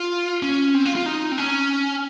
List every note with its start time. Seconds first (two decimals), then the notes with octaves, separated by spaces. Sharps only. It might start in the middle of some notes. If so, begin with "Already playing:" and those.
Already playing: F4
0.43 C#4
0.74 C4
0.85 F4
0.96 F4
1.06 D#4
1.32 C4
1.38 C#4